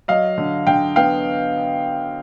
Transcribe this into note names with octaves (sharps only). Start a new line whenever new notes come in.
F#3 D#5 F5
D3
D3 F5 G5
B3 F5 G5